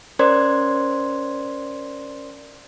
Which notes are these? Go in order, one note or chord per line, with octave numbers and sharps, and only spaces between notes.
C#4 A#4 C5 D5 C6 G#6